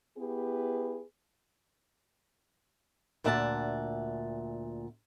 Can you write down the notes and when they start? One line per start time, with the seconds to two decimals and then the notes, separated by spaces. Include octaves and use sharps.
0.18 B3 E4 G4 G#4 B4
3.24 D2 A#2 E5 F#5 G#5 A5